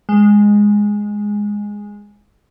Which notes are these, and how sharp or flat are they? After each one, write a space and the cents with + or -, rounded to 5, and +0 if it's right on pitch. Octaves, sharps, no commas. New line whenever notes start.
G#3 -10